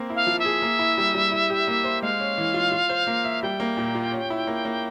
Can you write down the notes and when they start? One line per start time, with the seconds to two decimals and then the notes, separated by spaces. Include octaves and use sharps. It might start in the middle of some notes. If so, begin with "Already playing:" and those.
Already playing: A#3 C4
0.10 E4
0.15 F5
0.27 F3
0.39 E5
0.45 G#4
0.62 A#3
0.79 E4
0.98 G3
1.14 G3
1.32 E4
1.50 G4
1.67 A#3
1.84 C5
2.02 G#3 F5
2.20 C#4
2.38 E3
2.54 F4
2.72 F4
2.89 C5
3.07 A#3
3.25 E5
3.42 G3 G5
3.60 A#3
3.77 A#2
3.95 F4
4.12 C#4
4.30 E4
4.47 A#3
4.65 A#3